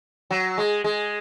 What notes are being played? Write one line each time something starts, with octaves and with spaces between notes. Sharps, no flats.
F#3
G#3
G#3